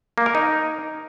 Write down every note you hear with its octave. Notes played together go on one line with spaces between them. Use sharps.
A#3
A#4
D#4